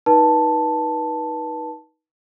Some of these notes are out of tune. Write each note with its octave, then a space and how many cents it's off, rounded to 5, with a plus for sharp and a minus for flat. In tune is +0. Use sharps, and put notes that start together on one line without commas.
D#4 +20 B4 -30 A5 +0